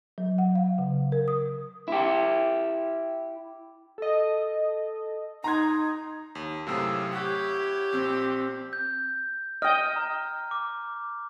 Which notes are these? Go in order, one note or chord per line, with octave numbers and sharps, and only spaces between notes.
F#3
F#5
F5
C#3
A#4
D#6
E4 G4
A4 D#5
D#4 A#5 C6 G#6
D#2
F#2 A2 C3 G#4 F5 E6
E4 G4 C#5 F#5 F#6
A#1 C4 E6
G6
D#5 G5 F6
A#5
D6